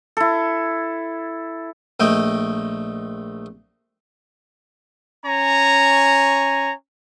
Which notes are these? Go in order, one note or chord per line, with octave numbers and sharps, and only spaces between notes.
E4 A4
A#1 A3 D#5 G5
C#4 C#5 G#5 A#5